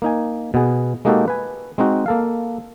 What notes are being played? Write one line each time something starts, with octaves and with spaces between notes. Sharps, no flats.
A#3 D#4 G#5
B2 B3 G#4
G#3 A#3 D#4 F#4 G4 A4
B4 G#5
G#3 C4 D#4 F#4
A#3 A4 F5